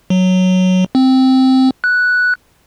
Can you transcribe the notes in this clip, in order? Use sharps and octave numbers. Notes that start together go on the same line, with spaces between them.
F#3
C4
F#6